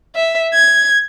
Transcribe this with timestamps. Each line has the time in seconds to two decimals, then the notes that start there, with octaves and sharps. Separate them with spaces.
0.15 E5
0.54 G#6